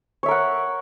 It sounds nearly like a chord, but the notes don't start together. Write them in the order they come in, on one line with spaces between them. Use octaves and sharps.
C#5 E5 A#4 F#5